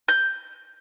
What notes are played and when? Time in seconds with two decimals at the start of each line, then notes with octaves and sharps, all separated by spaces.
0.09 G6